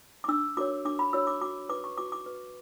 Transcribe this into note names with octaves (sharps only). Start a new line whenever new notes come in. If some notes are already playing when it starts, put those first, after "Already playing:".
D6
D4 E6
F#4 A#4 C#5 D6
D4 D6
B5
F#4 A#4 C#5 E6
D6
F#4 D6
B4 D6
C#6
F#4 D6
D6
B4